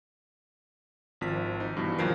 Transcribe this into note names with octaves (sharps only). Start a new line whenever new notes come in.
G#1 F3 B6
D#4
G2 B2 E3
D#2 F3 F#3 A#4 C7 D7